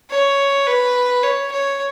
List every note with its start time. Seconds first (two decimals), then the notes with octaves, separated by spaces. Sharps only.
0.11 C#5
0.67 B4
1.23 C#5
1.52 C#5